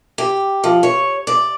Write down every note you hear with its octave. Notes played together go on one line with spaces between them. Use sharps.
G4
F3
C#5
D5